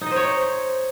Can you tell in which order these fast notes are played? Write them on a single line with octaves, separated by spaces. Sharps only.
D#4 D#5 C5 C#5